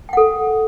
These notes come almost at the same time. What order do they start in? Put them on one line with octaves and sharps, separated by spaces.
G5 F#5 A4